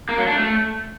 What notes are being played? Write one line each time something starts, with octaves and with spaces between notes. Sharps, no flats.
A#3
F#3
D4
A3